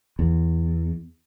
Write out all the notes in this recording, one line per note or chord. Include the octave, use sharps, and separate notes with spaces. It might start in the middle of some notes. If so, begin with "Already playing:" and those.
E2